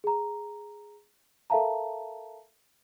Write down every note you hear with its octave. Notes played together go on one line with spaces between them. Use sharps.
G#4 A#5
A4 A#4 E5 F5 A5 A#5